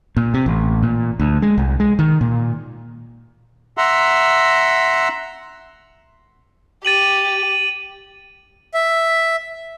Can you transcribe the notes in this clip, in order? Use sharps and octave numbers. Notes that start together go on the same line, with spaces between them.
A#2
C3
A1
A#2
D2
G#3
C2
G#3
D#3
A#2
E5 F#5 A#5 C6 E6
G4 A6 D#7 F#7
E5